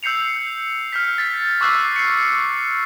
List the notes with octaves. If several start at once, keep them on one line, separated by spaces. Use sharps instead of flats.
E6 G6 C7 C#7 F7
F6 G6 B6
A6 B6
C#6 D6 E6 F#6 B6 C7
C7 C#7